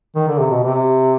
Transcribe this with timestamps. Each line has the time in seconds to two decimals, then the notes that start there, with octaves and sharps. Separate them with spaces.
0.16 D#3
0.28 D3
0.39 C3
0.50 B2
0.63 C3